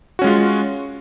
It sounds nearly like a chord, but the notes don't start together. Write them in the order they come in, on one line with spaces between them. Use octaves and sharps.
F#4 C#4 G#3 F4